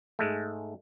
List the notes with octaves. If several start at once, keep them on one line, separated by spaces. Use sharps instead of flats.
G#2 G#3 A3